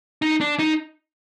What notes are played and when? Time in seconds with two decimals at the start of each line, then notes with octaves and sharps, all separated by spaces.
0.22 D#4
0.41 D4
0.59 D#4